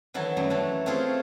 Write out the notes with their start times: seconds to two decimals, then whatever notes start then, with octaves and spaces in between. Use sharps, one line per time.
0.14 D#3 E3 F#3 F#4 A4
0.37 F#2 G3 A3
0.50 E3 D4 A4
0.86 A3 C4 C#4 F4 G#4 A4